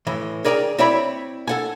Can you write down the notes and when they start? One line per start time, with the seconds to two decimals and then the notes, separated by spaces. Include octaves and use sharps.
0.07 A2 E3
0.45 G#4 A#4 D5 G5 G#5 A#5
0.78 C4 E4 C#5 D5 B5
1.48 A4 F#5 G#5